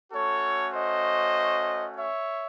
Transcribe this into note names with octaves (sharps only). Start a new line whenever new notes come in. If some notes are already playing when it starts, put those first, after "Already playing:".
A3 C#4 F#4 A4 C#5
C5 D#5
C#5 E5